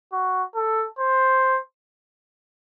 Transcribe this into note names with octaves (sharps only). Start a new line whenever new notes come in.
F#4
A4
C5